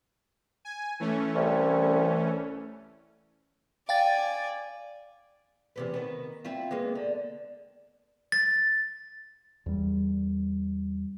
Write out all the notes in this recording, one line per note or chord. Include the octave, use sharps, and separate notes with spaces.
G#5
E3 A3 C#4
C2
D5 F5 G5 G#5 A6
E2 C3 B3
D#3 B3
C4 E4 F4
G#3 A#3 B3
D3
A6
E2 G3